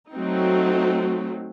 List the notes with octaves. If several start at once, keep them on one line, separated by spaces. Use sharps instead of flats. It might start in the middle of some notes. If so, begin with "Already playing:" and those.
F#3 A3 C4 D#4